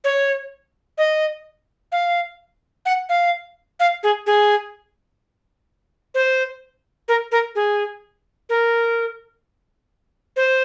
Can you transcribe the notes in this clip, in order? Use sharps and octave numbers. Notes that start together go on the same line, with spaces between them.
C#5
D#5
F5
F#5
F5
F5
G#4
G#4
C5
A#4
A#4
G#4
A#4
C5